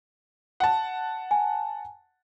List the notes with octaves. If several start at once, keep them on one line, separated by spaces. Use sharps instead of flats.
F#5 A5
G#5